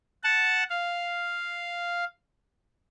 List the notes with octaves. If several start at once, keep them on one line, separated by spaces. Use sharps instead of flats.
F#5 A5
F5